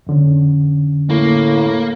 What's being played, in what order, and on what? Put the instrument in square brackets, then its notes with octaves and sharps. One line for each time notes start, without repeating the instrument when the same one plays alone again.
[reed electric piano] F2 D3 C#4
[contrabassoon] A2 [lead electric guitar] A#3